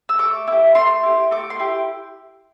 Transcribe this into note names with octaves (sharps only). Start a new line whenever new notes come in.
E6
A3 D6
E4 G4
A3 C6
E4 G4
A3 D6
C6
E4 G4